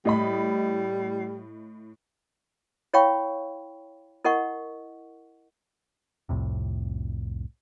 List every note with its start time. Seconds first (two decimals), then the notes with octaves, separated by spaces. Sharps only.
0.05 A2 G3 D#5 B5
2.93 E4 C#5 F5 G5 B5 C#6
4.25 E4 A#4 D#5 F#5 C#6
6.29 C2 F2 A2 C3